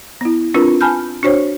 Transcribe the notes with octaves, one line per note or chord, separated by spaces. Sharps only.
B3 E4
C4 D4 F4 A#4 B4
G#5 A5 B5 F6 G6
D4 F#4 C5 C#5